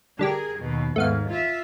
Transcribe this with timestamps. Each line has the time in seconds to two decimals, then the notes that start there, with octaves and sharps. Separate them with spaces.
0.19 D3 G3 G4 G#4 A#4
0.60 D#2 B2
0.96 D#2 G#2 A3 B3 F5
1.30 F4 E5